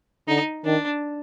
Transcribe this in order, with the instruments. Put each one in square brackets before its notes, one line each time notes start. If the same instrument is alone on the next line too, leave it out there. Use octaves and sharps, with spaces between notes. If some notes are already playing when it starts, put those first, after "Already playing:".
[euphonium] D3 [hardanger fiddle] D#4
[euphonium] D#3 [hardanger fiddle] D4